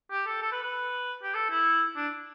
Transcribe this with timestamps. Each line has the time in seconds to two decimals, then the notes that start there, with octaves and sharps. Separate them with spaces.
0.11 G4
0.26 A4
0.42 A4
0.52 B4
0.63 B4
1.23 G4
1.35 A4
1.50 E4
1.96 D4